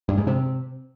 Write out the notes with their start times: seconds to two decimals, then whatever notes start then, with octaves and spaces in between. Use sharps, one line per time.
0.09 G2
0.18 G#2
0.27 C3